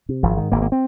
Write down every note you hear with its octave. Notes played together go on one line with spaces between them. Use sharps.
C3
G#1 F3
G#2 D#3
G#1 A#3
A#3
C4